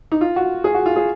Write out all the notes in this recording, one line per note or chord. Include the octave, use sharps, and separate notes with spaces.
D#4
F4
F#4
G#4
F#4
F4
G#4